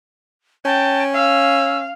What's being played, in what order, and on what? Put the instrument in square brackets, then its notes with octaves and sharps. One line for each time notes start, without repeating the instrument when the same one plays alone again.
[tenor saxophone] C#4 [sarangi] G5 [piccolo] A5
[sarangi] F5 [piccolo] E6